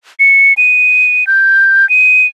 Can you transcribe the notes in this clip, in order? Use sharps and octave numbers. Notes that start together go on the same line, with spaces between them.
C#7
D#7
G6
D#7